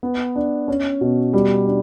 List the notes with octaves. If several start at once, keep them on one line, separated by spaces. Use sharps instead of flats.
B3
D4
C#4
B2
G3
D4